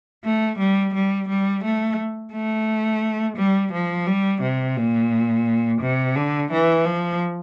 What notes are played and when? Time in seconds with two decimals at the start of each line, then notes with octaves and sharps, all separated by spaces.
0.25 A3
0.58 G3
0.94 G3
1.29 G3
1.64 A3
2.32 A3
3.37 G3
3.73 F3
4.07 G3
4.42 C3
4.77 A#2
5.81 C3
6.15 D3
6.52 E3
6.85 F3